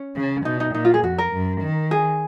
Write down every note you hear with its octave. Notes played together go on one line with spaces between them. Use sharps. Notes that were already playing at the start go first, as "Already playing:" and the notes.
Already playing: C#4
C#3
B2 D#4
D#4
A#2 D#4
F4
G#4
F2 F#4
A#4
F#2
D#3
G#4